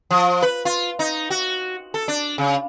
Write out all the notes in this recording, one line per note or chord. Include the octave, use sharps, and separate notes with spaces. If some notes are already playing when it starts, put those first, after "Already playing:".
F3
B4
F4
D#4
F#4
A4
D4
C#3